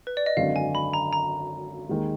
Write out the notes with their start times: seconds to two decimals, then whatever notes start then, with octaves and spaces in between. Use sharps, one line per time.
0.07 B4
0.17 D5
0.26 D#5
0.37 G#1 F#2 D3 F5
0.56 G#5
0.75 B5
0.94 A#5
1.13 A#5
1.89 D#2 D#3 G#3